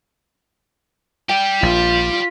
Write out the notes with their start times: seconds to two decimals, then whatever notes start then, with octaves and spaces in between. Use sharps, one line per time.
1.29 G4 D5 G5
1.63 A#1 F4